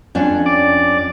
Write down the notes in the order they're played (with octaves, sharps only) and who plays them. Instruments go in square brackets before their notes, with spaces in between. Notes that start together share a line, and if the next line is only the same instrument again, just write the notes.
[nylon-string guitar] F2 C#4 D4
[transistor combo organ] D5